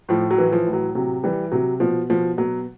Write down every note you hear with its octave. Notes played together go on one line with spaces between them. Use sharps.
A2 F3
F#3
E3
F3
A2
F#3
C3 F#3
E3 G3
C3 F#3
B2 F3
B2 F3
B2 F#3